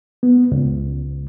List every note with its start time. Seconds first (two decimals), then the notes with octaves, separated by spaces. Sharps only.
0.23 B3
0.52 C#2